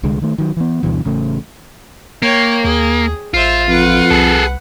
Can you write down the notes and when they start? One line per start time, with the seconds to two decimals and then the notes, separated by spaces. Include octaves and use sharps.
0.03 C2 D3 G#3
0.22 D#3 A3
0.38 D#3 F#3
0.57 E3 B3
0.83 D2 G2 B2 E3
1.05 A1 C#3 A3
2.22 A#3 C#5 G5
2.64 D#2 G#4
3.34 A1 F4 C5 E5
3.68 F2 B4 F#5
4.11 C2 G#4 A4